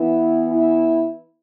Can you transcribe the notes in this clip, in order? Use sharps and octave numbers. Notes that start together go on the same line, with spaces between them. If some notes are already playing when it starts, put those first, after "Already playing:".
Already playing: E3 B3 E4
E4